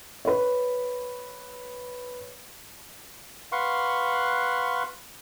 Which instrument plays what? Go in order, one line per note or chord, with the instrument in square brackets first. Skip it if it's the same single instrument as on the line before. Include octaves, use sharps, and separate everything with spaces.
[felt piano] B4 C#5
[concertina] B4 F5 F#5 C6 C#6